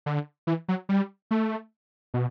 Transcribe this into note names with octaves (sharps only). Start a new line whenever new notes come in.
D3
E3
F#3
G3
A3
B2